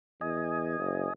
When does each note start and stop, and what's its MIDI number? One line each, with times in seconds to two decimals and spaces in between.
0.21 0.76 40
0.21 1.13 75
0.21 1.13 80
0.79 1.06 30